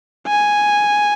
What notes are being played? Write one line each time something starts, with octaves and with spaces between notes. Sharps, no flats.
G#5